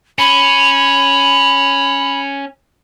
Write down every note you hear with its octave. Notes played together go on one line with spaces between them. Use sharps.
C#4 B5